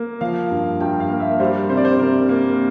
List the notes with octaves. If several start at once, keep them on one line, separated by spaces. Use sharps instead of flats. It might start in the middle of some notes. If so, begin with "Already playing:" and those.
Already playing: A#3
F3 F5
G2
G2 G5
F5
A#3
E5
G3 C5
C3 C5
D5
C5
C3 A#4
A#3